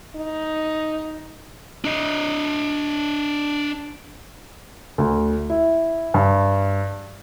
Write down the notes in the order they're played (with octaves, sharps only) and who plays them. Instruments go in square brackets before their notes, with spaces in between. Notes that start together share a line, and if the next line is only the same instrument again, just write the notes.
[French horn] D#4
[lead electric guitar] D4 D#5
[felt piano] D2
E4
G2